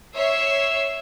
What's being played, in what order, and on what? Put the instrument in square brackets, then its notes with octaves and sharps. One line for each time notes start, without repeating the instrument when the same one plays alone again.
[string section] C#5 E5 E6 C7